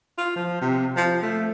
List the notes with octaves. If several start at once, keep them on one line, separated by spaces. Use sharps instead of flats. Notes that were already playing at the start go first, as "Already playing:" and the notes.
F4
F3
C3
F3
A3